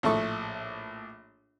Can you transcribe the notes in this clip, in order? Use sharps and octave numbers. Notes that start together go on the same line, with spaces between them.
A#1 A2 A4 E5 C#6